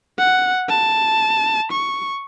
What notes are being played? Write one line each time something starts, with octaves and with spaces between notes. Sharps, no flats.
F#5
A5
C#6